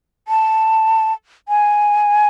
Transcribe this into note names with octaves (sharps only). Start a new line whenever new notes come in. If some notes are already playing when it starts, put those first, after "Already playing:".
A5
G#5